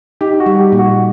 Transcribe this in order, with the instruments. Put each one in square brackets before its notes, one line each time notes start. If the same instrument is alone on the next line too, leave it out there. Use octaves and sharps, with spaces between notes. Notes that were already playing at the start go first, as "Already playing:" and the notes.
[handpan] D#4 [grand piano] G4
[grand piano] F#4
[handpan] G3
[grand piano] G4
[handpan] A#2
[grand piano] F#4